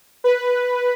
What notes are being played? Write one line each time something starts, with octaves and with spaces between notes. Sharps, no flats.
B4